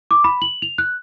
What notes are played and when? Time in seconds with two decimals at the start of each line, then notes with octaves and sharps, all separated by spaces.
0.11 D6
0.24 B5
0.42 F#7
0.62 F7
0.78 F#6